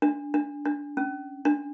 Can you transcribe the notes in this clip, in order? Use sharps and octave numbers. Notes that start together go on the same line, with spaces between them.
D4
D4
D4
C#4
D4